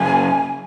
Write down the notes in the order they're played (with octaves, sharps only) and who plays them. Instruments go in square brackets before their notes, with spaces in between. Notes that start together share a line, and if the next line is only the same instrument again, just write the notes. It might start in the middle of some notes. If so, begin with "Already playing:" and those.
Already playing: [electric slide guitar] F#2 C#3 A#3 [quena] G#5